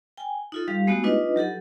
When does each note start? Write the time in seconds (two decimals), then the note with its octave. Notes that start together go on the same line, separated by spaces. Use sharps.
0.17 G5 G#5
0.52 D#4 F4 A4
0.68 G3 G4 F5
0.87 G#3 A3 B3 D#4 F#4 G4
1.04 D4 D#4 F4 B4 D#5
1.36 F#3 G4 A4 F#5